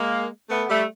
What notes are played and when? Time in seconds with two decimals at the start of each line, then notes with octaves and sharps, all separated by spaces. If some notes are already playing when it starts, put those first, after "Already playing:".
Already playing: G#3 A#3
0.50 A3 B3
0.70 G3 A3